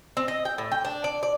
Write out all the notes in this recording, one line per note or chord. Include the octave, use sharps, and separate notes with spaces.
C4
D#5
G5
A2
G5
D4
D5
D5